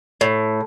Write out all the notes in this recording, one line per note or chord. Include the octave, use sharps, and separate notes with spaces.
A2